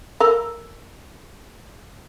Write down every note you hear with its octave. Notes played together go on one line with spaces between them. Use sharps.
A4 A#4